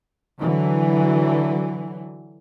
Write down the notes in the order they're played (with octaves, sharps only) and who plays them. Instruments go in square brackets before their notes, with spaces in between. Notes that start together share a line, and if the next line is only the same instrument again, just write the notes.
[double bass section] D3 E3 F#3